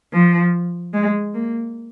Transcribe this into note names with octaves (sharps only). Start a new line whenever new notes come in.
F3
G#3
A#3